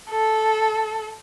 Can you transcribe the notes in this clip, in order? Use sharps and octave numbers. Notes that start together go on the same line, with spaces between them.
A4